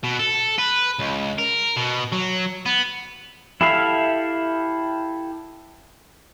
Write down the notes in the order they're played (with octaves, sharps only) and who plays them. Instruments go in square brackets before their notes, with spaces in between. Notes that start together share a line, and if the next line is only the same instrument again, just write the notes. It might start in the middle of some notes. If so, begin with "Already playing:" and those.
[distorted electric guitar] B2
A4
B4
C#2
A#4
B2
F#3
B3
[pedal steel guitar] E4 G4 A4 E5 F5